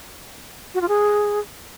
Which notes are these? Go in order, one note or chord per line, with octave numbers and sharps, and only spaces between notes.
F#4
F4
G#4